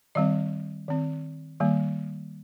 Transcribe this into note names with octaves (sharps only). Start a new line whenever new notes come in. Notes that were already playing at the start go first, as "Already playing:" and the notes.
D#3 G3 C4 D#5
D#3 C4
D#3 G3 A#3